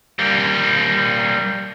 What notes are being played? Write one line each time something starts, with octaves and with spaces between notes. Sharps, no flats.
G3 A#3